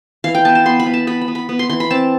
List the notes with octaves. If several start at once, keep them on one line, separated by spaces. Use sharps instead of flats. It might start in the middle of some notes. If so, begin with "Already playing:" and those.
E3 F5
G5
B3 A5
A5
B3 C6
B5
B3
A5
B3 B5
B5
B3
B5
B3
C6
E3 C6
B5
C4 A5